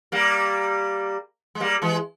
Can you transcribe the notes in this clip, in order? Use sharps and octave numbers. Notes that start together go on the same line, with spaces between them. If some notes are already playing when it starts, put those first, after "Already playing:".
G3 A#3
G#3
G3 A#3
E3 G#3